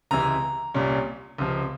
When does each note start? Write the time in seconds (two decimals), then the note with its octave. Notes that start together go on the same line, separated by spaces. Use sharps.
0.11 C#2 C3 E3 A#5
0.74 C2 A#2 G3 C#4
1.38 C#2 C3 F3